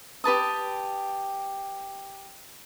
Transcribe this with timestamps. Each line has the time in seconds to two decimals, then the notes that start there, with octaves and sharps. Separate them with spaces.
0.24 G4 B4 A5 D#6